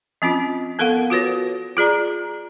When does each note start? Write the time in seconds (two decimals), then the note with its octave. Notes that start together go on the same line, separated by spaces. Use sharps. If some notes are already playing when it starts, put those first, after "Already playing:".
0.22 F3 C4 C#4 F4
0.79 B3 A4 A#4 F5 F#5
1.10 F4 F#4 B4 C#5
1.77 F4 G#4 D5 A#5